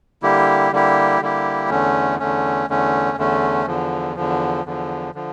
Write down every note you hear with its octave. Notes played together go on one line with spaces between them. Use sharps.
D3 G3 A#3 E4 G4
D3 G3 A#3 E4 G4
D3 G3 A#3 E4 G4
E2 D3 A3 C#4
E2 D3 A3 C#4
E2 D3 A3 C#4
E2 D3 A3 C#4
E2 D3 F3
E2 D3 F3
E2 D3 F3
D3 F3